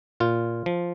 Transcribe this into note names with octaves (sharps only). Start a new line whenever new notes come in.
A#2 F4
F3